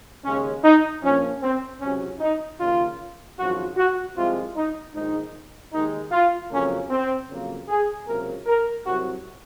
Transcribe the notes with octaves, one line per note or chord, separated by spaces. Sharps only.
D#2 C#3 G#3 C#4
D#4
A#1 A#2 F3 C#4
C4
C#2 C3 F#3 C#4
D#4
D#2 C#3 F3 A#3 F4
G#1 F#2 F3 F#4
F#4
C2 C3 F3 G#3 F4
D#4
A#1 G#2 D#3 G#3 D#4
D#2 D#3 G#3 D#4
F4
F2 C#3 F#3 A#3 C#4
C4
F2 C#3 F#3 A#3
G#4
C#2 C3 F#3 A#3 A#4
A#4
C2 C3 F#3 F#4